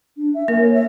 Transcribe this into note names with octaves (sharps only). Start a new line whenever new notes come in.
D4
E5
A#3 A#4
C#5
E5